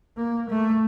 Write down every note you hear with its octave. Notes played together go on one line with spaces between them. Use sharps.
A#3
A3